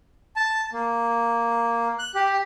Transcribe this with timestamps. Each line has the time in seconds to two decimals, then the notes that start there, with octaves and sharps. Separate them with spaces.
0.36 A5
0.73 A#3
1.99 F#6
2.15 G4